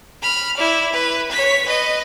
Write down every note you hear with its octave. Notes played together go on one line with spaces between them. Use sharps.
B5 F6
E4 D5
B4
C#5 B6
B4 D#5